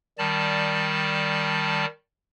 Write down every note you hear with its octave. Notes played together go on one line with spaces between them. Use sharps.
D#3 G3 D5 A5